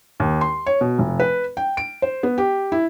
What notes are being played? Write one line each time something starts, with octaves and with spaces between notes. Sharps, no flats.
D#2
C6
C#5
B2
F1
B4
G5
D7
C5
B3
G4
E4